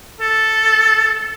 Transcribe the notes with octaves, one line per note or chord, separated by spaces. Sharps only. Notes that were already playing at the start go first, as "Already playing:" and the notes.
A4